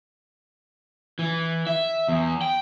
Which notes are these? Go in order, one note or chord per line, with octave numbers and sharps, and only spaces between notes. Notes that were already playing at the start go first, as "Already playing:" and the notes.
E3
E5
E2
G5